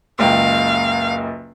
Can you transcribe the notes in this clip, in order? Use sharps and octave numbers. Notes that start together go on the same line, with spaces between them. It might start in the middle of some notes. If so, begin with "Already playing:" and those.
F#1 C#2 F5 G5